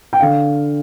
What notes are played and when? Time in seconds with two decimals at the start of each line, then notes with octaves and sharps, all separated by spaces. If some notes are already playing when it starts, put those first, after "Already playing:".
0.13 G5
0.20 D3 F5